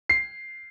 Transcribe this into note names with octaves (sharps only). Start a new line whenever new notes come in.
C7